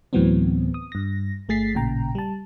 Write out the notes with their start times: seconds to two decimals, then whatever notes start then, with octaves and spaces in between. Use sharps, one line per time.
0.13 D2 A2 E3 F#3 B3 C4
0.74 D#6
0.92 G2 A#6
1.49 G1 A3 G#4 A6 B6 C7
1.75 A1 A#2 C#3 G5 A#5
2.15 G3 A5